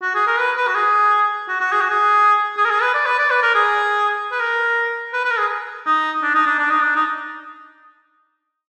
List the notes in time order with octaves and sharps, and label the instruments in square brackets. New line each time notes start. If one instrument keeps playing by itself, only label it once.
[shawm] F#4
G#4
A#4
B4
B4
F#4
G#4
F#4
F#4
G#4
F#4
G#4
G#4
A#4
G#4
B4
D5
B4
D5
B4
A#4
G#4
B4
A#4
B4
B4
A#4
G#4
D#4
D4
D#4
D4
D4
D#4
D4
D#4